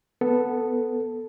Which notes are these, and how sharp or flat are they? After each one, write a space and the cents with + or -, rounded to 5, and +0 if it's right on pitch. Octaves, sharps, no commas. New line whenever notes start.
B3 +0 A4 +0